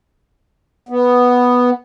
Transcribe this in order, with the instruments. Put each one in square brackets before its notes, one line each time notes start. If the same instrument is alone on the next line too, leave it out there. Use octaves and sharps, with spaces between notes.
[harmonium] B3